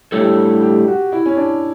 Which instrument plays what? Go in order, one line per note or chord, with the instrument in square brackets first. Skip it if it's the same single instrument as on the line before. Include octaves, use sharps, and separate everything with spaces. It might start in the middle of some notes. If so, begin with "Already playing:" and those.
[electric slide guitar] A2 G3 D4 A4 C#5 [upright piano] G4
[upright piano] G4
F#4
E4
C#4
D4